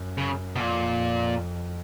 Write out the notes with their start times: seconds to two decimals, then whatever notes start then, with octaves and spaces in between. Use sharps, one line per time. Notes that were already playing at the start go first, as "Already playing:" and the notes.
Already playing: F#2
0.18 C#3
0.56 B2
0.59 F2 A#2